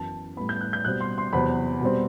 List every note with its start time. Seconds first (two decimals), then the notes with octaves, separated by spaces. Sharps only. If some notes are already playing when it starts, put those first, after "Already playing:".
Already playing: F#2 E3 B3 A5
0.37 A2 G3 B3 B5
0.49 G6
0.61 F#6
0.73 G6
0.85 B2 G3 C4 F#6
1.01 C6
1.18 C6
1.33 E2 C3 F#3 C4 B5
1.81 B2 G3 C4